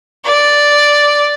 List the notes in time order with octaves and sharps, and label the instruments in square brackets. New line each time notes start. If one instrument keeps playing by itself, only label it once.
[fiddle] D5